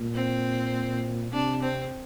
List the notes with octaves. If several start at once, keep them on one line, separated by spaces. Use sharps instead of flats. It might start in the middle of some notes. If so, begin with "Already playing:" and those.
Already playing: A#2
C4
C3 D4
C4